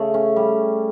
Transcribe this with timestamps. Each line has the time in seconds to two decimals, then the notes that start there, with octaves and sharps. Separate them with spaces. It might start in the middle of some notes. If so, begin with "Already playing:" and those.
Already playing: C#3 A3
0.14 C#4
0.36 G3